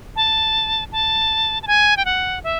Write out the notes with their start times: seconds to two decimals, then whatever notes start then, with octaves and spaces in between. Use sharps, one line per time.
0.16 A5
0.92 A5
1.63 A5
1.67 G#5
1.97 G5
2.05 F#5
2.44 E5